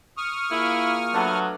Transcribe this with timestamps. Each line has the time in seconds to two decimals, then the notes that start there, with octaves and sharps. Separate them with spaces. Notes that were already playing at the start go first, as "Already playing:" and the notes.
0.17 C#6 D#6 F6
0.51 A#3 E4 F4 G#4
1.14 F#3 A3 B3 D4